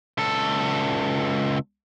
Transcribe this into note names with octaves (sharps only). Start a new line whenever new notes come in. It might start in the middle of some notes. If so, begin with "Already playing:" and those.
C#2 A4